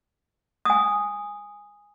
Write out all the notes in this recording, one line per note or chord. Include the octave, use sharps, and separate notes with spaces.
G#5 D#6